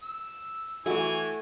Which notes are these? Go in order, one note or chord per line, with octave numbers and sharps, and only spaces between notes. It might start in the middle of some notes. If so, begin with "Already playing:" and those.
E6
E3 A3 F#4 G#5